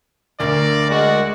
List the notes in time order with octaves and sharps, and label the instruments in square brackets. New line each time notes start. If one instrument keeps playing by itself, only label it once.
[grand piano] D2 [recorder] A#4 [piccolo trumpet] D5
[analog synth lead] G#3 [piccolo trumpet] F#4